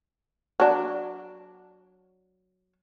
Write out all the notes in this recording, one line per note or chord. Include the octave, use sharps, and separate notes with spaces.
F#3 D4